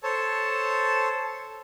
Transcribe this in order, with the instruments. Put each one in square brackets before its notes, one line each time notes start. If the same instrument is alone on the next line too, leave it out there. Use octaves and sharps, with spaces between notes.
[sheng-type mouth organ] A4 C5 C#5 A5